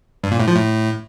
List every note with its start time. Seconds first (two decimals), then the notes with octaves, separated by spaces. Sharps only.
0.24 G2
0.32 A#2
0.40 A2
0.48 F3
0.56 A2